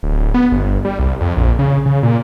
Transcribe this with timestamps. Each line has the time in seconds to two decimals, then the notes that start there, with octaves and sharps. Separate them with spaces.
0.03 D1
0.34 B3
0.52 G1
0.85 G3
0.99 C2
1.21 F2
1.37 A#1
1.59 C#3
1.86 C#3
2.03 A#2